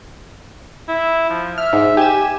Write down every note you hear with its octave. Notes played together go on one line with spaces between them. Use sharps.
E4
F3
E5 F6
G#2
G4 G#5 E7